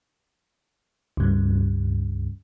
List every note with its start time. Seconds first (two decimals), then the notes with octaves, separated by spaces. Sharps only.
1.17 C#2 G2